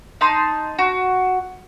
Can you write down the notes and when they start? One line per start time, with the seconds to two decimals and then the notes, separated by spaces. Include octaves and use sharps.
0.21 D#4 A5 C6
0.78 F#4